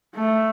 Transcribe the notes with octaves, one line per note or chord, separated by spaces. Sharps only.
A3